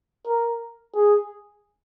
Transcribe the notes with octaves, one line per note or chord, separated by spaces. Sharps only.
A#4
G#4